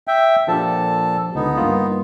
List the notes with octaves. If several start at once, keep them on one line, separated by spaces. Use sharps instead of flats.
E5 G5
A#2 F3 D4 G4 A4 A5
C#2 D3 B3 D#4
G2 A#3 F4